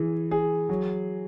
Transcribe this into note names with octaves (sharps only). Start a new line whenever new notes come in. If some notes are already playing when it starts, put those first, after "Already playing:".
Already playing: E3 G#4
G#4
F#3